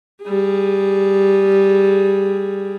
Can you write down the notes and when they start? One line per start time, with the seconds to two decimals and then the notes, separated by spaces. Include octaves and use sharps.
0.23 G3 G#4